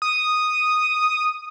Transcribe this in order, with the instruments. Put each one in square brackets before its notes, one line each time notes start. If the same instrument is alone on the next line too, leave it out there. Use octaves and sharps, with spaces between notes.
[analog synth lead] D#6